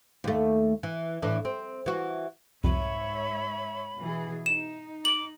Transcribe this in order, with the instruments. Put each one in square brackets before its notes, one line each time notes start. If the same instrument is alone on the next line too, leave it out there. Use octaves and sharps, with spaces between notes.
[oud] D#2 A3
E3
A2 E3 D4
C4
E3 F#4
[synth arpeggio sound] C2 F2 [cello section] G#2 C#5 E5 [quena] B5
[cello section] B2 E3 G#4
[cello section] D#4 [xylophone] E7
[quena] D6 [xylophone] F#7